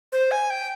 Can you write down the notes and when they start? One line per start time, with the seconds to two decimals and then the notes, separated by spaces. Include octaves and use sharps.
0.12 C5
0.31 G#5
0.50 G5